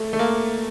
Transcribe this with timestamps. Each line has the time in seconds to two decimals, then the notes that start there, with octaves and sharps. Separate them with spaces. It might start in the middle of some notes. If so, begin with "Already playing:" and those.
Already playing: A3
0.13 A3
0.19 A#3